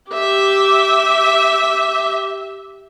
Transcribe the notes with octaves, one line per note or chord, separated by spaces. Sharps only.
G4 E5